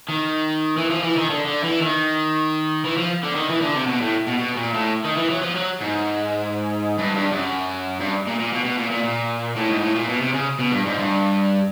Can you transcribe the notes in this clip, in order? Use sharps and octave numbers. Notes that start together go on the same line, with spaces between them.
D#3
E3
F3
E3
D#3
D3
D3
E3
D#3
E3
F3
D3
D#3
E3
D3
C3
B2
A2
B2
B2
A#2
A2
D#3
E3
F#3
F3
F#3
G#2
G2
G2
F#2
G2
A#2
A#2
B2
B2
A#2
A#2
A#2
A2
G#2
A2
A#2
B2
C3
C#3
B2
G2
G#2
G2